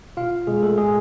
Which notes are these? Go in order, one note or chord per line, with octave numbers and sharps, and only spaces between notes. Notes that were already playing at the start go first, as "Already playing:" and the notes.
B2 F4 F5
B2 G#3 G#4
A3 A4
A2 G#3 G#4